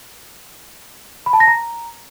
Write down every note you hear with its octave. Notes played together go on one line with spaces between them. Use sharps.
B5
A5
A#6
A#5